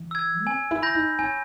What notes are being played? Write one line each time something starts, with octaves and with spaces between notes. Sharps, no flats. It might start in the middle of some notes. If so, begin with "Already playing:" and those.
Already playing: E3
E6 G#6
C#4 G#5
E4
B5 G6 A#6
D#4
C#4 G#5